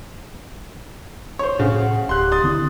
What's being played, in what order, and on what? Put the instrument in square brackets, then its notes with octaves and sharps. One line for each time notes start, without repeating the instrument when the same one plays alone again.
[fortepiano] C5 C#5
[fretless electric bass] A2 [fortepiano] C#3 [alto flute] F#5
[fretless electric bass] D1 [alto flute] G4 [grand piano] C6 F#6
[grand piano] C6 D#6 A6
[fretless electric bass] D3 C4 [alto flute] E4